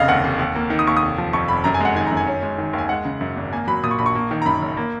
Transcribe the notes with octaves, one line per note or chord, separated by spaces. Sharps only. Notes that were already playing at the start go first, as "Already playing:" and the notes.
Already playing: F1 C#3 D#5 F5
D#2 F#5
F1
D#2
A#3
D#3
D#6
D#2 C#6
D#6
F1
F3
F2 C#6
F1 B5
F#2 A#5
G#5
G#3 F#5
D#3 G#5
F#2 A#5
G#5
C#4
G#3
D#3
D#2 G#5
G#3 F#5
C#3
F#2
G#1
A#3 G#5
F#3 B5
A#2 D#6
C#6
A#1 B5
C#6
A#3
D#3
A#5
F#2 B5
F#1
A#3